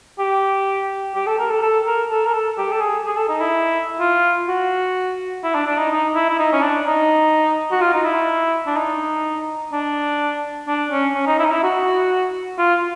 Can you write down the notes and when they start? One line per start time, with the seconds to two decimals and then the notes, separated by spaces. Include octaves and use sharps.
0.19 G4
1.15 G4
1.26 A4
1.38 A#4
1.50 A4
1.62 A4
1.86 A#4
2.10 A4
2.26 A#4
2.33 A4
2.58 G4
2.72 A4
2.81 G#4
3.05 G#4
3.17 A4
3.29 D#4
3.41 E4
4.00 F4
4.48 F#4
5.43 E4
5.55 D4
5.66 D4
5.78 D#4
5.91 D#4
6.14 E4
6.29 E4
6.39 D#4
6.53 C#4
6.62 D4
6.86 D#4
7.71 F#4
7.81 F4
7.94 D#4
8.05 E4
8.67 D4
8.77 D#4
9.72 D4
10.68 D4
10.91 C#4
11.15 C#4
11.27 D#4
11.39 E4
11.45 D#4
11.51 E4
11.63 F#4
12.58 F4